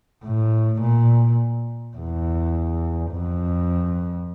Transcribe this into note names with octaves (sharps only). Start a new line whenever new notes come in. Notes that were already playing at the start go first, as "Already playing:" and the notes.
A2
A#2
E2
F2